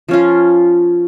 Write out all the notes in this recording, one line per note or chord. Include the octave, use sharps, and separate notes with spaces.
F3 C#4 F4